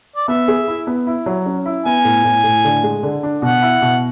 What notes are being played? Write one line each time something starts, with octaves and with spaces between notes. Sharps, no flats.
D5
B3 E5
G#4
E4
B3
E4
F#3
C#4
E4
B3 G#5
A2
A2
A2
D3
G#3
D3
D4
B2 F#5
E4
B2